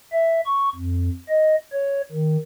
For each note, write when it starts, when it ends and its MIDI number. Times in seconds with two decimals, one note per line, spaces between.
0.12 0.41 76
0.46 0.69 85
0.75 1.09 41
1.29 1.55 75
1.72 2.01 73
2.12 2.37 51